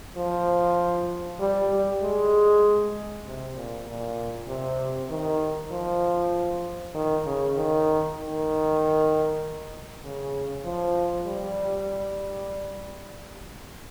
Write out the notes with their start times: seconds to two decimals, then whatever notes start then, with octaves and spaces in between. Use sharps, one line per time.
0.17 F3
1.40 G3
1.71 G3
2.01 G#3
3.25 C3
3.56 A#2
3.87 A#2
4.48 C3
5.10 D#3
5.72 F3
6.95 D#3
7.26 C#3
7.57 D#3
8.19 D#3
10.03 C#3
10.65 F3
11.27 G3